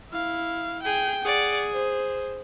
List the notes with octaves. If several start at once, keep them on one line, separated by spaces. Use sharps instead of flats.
E4 F5
G#4 G5
G#4 D5 F#5
C5